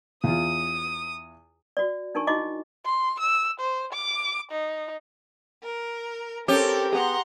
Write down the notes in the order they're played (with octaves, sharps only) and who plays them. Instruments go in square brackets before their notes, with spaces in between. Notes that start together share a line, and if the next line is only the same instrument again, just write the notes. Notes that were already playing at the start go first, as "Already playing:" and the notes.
[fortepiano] E2 F4 [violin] D#6
[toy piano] F#4 D5
D4 D#4 A#4 G#5 C#6
D#4 E4 F#4 D#5 D6
[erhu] C6
E6
C5
D6
D#4
[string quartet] A#4
[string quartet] C4 A4 A#4 [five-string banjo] C#4 [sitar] G4
[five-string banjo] B3 G#4 [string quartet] F#5 A#5 C6